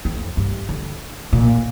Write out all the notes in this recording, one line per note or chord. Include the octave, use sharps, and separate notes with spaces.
F2
G2
D3
A#2